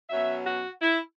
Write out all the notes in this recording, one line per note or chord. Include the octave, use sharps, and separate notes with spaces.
B2 F#3 C#4 E5
F#4
E4